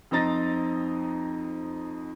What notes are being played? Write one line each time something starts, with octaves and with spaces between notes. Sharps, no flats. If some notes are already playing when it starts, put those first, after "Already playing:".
F2 C4 D#4 A#5 A6 A#6